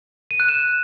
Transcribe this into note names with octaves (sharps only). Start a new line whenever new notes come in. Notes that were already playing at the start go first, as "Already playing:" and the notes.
D#7
F#6
E7